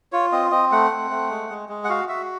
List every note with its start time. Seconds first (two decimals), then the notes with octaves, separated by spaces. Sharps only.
0.12 F4 C#5
0.32 C4 D#5
0.51 C4 D#5
0.72 A3 F#5
0.91 C4
1.11 A3
1.30 G#3
1.50 G#3
1.69 G#3
1.84 F#5
1.89 F#4 F5
2.09 F#4 E5